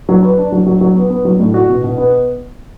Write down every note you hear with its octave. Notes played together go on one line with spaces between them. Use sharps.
F#3
B4
D4
F#3
F#3
F#3
B3
B3
F#3
A2
F#4
B2
B2
B3